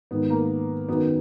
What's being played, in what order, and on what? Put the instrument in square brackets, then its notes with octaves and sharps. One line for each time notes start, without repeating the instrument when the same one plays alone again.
[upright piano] G#2 D#3 B3
A#3
F#2 D#3 B3